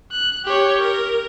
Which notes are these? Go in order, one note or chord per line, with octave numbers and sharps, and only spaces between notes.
F#6
G4 C#5
A#4